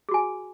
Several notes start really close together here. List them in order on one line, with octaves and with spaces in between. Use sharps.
G#4 F#4 G#5